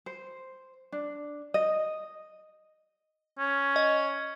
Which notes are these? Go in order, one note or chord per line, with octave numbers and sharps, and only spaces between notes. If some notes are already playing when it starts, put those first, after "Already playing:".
C5
D4
D#5
C#4
D#5